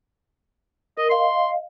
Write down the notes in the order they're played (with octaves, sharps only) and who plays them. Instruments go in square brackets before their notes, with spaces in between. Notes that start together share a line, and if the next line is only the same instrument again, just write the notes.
[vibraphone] A#4 [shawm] D#5
[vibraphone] D#5 F5 [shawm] C6